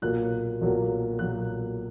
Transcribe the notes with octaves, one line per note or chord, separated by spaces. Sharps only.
B1 A#2 F#3 A#3 F#6
B1 A#2 F#3 A#3
B1 A#2 F#3 A#3 F#6